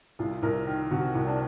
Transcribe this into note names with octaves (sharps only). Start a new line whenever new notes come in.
C2 F4
C2 A#4
D#3
C3 F#4
C2
D4